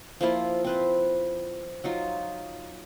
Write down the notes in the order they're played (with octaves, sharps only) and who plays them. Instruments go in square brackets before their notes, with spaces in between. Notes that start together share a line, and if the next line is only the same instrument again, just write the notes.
[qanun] F3 A#3 E4 F4
C4 B4 C5
F#3 D#4 F4